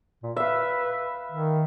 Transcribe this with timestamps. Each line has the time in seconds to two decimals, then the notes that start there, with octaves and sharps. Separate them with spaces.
0.23 A#2
0.36 B4 E5 F5
1.32 D#3